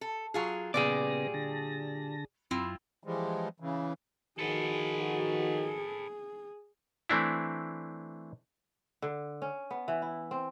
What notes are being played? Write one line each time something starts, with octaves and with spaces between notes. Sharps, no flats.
A4
F#3 F4 G#4
A#2 C#3 G3 B3 G#4 D5 G5 A#6
D3 A5 A#6
F#2 C4 E4 F4
E3 F3 G3 G#3
C#3 E3
D#3 F3 F#4 G#4 A4 B4
E3 A3 C4 D4 E4
D3
C#4
B3
E3
E4
C4